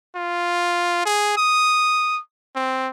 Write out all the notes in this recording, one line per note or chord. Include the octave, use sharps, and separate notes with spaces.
F4
G#4
D#6
C4